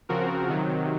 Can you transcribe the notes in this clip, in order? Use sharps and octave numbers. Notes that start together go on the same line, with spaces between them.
C#3 F3 C4 F#4 A#4
C3 D#3 F#3